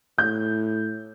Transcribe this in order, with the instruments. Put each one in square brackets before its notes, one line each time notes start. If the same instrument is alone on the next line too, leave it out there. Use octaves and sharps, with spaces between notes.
[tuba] A2 [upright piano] G6